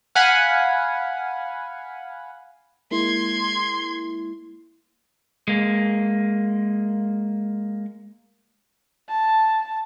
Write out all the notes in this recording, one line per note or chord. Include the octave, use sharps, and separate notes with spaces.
F5 F#5 G#5 B5
G#3 A#3 E4 C6 G#6
G#3 A#3
A5